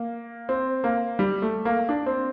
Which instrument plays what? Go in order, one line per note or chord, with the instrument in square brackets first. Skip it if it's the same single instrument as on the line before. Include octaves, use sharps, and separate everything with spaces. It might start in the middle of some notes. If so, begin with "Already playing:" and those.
Already playing: [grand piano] A#3
C4
A#3
G3
A3
A#3
D4
C4